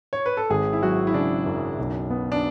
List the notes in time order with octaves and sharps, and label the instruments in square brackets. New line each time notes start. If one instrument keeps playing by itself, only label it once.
[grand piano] C#5
B4
A4
[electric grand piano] G#1 [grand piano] G#4
[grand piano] E4
[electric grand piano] F#3 [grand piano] F#4
[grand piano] E4
[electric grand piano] C#3 [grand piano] D4
[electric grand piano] F#2
B1
B3
[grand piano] D4